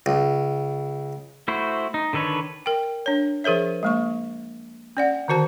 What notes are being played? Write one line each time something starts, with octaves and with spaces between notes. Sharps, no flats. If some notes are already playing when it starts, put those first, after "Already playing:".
C#2
A3 E4 F#4 C5
D#4
D3 D#3 A4 B4 C#5
A#4 G5
D4 C#5
F3 G#4 A#4 C#5 E5
G#3 A#3 C#6
C#4 D5 F#5
D3 D#3 F#4 C5 A5